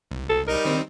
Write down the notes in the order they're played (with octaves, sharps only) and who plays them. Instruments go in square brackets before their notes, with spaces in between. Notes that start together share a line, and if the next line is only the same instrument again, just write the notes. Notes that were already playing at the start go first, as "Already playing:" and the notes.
[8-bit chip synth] C2
[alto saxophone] A4
[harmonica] G3 D#4 [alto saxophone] A#4
[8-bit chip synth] D#3 C4